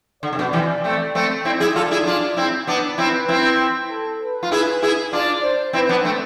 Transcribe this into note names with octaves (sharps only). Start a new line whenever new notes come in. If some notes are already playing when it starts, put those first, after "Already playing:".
D3 D5
C3
B2
C3 E3
A3 C4
A3 C4
C4 E4 D5
E4 G#4
F4 A4
E4 G#4
D4 F4
C4 E4
B3 D4 B4
C4 E4
C4 E4
A4
B4
F4
E4 G#4
E4 G#4
D4 F4 D5
C5
C4 E4 B4
B3 D4
A3 C4